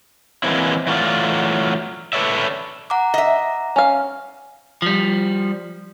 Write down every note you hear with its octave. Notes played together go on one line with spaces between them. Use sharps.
E3 F#3 G#3 A#3 C4 E4
E3 F#3 A3 F4 D5
A4 B4 C#5 D5 E5
F#5 A#5 D6
D#5 E5
C#4 F5
F3 G3